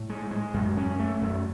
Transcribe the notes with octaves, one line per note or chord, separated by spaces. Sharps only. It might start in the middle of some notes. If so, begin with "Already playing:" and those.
Already playing: A2
G#3
G#3
F#2
C#4
A3
F#2